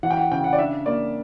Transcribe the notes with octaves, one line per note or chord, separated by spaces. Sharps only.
E3 F#5
G5
F#5
C#3 G5
F#5
D5
D4 E5
A#3 D5